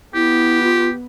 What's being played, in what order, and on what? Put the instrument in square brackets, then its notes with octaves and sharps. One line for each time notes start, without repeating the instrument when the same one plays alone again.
[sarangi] B3 [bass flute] E4 [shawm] G4
[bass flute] F4